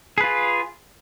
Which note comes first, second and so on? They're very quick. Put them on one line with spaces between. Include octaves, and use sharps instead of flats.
G#4 B4 F4